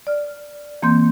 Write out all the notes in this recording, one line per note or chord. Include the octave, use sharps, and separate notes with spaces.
D5 F6
E3 A#3 C4 C6 G6